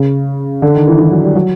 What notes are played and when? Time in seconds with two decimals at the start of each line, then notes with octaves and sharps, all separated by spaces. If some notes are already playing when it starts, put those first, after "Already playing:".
Already playing: C#3
0.62 D3
0.75 D#3
0.87 E3
0.99 E3
1.11 F#3
1.24 G3
1.35 F#3